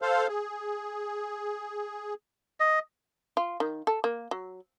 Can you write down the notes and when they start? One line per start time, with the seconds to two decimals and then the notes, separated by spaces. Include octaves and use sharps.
0.02 A4 C5 F5
0.28 G#4
2.60 D#5
3.37 F4
3.60 D#3
3.87 A4
4.04 A#3
4.31 F#3